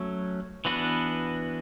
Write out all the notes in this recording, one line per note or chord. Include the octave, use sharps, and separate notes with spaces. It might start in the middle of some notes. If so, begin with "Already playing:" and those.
Already playing: F#3 A3 C#4
E3 B3 D4 F#4 B4